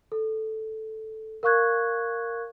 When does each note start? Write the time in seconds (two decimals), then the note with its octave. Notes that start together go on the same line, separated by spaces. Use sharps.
0.12 A4
1.43 A#4 F5 C#6 F#6 G#6